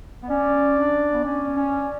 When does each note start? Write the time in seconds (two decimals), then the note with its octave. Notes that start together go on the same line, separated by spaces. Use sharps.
0.22 B3
0.30 C#4 D5
0.78 D4
1.13 B3
1.24 C#4 D5
1.56 C#4